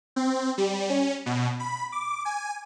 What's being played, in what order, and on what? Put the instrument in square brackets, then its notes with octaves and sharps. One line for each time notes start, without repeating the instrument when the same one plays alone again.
[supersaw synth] C4
G3
C#4
B2
B5
D6
G#5